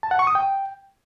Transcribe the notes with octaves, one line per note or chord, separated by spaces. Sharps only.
A5
F#5
C#6
D#6
G5